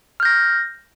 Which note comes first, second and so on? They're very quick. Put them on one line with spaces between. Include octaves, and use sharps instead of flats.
F6 G6 A#6